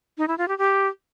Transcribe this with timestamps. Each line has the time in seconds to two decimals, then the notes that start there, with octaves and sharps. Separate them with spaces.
0.18 D#4
0.28 E4
0.38 F4
0.48 G4
0.58 G4